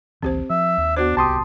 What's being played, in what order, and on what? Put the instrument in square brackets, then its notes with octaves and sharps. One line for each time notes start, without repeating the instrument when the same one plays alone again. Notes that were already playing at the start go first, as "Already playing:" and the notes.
[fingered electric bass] A#1 D#2 E3 [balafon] C4 G4 C5
[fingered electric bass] F3 [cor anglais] E5
[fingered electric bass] D#2
[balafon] B3 F#4 C5 [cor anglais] D4
[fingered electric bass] D1 C2 [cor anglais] G4 [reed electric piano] A5 C6 D#6